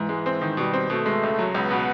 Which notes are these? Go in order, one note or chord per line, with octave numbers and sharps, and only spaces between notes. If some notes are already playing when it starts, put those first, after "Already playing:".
Already playing: G#2 E3
G#3
C4
D#3
B2 G3
C4
B2 A3
G#3
C#2
F#3
C#2 B3
B2